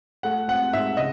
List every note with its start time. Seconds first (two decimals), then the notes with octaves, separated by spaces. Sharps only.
0.23 A3 F#5
0.48 C4 F#5
0.73 G#2 E5
0.97 C#3 D#5